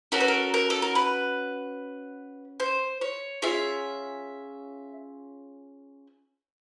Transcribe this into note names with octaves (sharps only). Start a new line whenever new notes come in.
C#4 F#4 A4 A#4
B4
A#4
A#4
A4
A#4
B4
C5
C#5
C#4 F4 G#4 E5